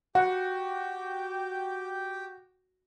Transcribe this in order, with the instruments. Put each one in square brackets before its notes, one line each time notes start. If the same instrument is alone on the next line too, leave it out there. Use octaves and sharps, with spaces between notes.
[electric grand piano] F#4 [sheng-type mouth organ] G4 G5 D6 [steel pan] F#5